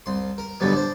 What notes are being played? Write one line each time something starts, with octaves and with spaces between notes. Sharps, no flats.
C2 C6
A#4
G2 B2 D3 F#3 G3 B3
D4 C5